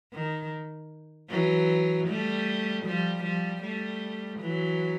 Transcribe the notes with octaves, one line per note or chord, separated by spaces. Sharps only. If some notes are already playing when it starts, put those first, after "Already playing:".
D#3
E3 F#3
G3 A3
F3 G3
F3 G3
G3 A3
E3 F#3